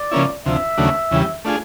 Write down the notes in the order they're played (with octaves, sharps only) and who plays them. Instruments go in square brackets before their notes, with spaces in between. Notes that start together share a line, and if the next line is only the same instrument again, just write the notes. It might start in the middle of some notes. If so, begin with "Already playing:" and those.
Already playing: [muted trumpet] D5
[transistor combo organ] C#3 F3 A#3 C#4 E4
[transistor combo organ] D2 C3 F3 [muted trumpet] E5
[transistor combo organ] D#2 C#3 F#3 A3 D4
E2 C#3 E3 G3
A3 D4 F4 G#4